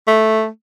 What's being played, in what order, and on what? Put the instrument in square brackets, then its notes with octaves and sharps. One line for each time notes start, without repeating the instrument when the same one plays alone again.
[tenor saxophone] A3